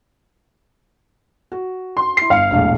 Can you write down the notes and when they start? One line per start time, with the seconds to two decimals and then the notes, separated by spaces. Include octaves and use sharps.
1.52 F#4
1.97 C6
2.17 E4 C7
2.30 G1 F5 C#7
2.51 E1 A#1 A2